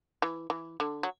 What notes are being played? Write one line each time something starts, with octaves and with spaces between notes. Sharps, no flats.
E3
E3
D3
F#3